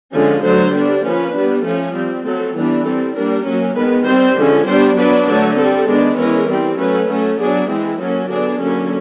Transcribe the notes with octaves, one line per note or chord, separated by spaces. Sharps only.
D3 F3 G#3 C#4
D3 F#3 A3 D4 C5
G3 B3 D4
F3 A#3 C#4 B4
G3 B3 D4
F3 A3 C#4
G3 C4
F#3 A3 C4 A4
E3 G3 B3 D4
G3 C4 A4
G3 A#3 D4 A#4
F#3 A#3 C#4
D#3 G#3 B3 B4
G3 C4 C5
D3 F3 G#3 C#4
G3 B3 D4 C5
F#3 B3 D4 B4
D3 F#3 A3
G3 C4 A4
D#3 G#3 B3 D4
E3 G#3 C#4 A#4
E3 G3 C4
F#3 A3 C#4 B4
F#3 A3 C#4
F#3 B3 D4 G#4
E3 G#3 C4
F#3 A#3 C#4 A4
D3 F#3 B3 D4 G#4
D3 F#3 A#3 C#4